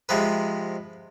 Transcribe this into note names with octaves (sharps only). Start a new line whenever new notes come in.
C3 F3 G#3 B4